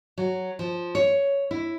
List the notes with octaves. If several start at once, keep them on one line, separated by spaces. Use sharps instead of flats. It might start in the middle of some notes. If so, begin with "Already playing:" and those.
F#3
F3
C#5
E4